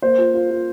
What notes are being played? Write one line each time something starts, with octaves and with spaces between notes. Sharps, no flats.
A#3 C5
F4
F4
F4